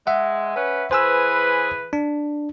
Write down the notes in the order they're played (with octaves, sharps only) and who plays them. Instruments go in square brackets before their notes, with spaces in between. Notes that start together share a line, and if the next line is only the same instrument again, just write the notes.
[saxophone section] G#3 [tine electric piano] E5 F#5
[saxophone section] C#4 B4
[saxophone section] E3 G#4 B4 [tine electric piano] C5 G#5 E6
[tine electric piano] D4